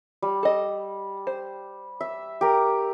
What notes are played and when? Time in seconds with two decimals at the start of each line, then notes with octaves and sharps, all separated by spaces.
0.22 G3
0.43 A4 D#5
1.27 C5
2.01 E5
2.41 G4 A#4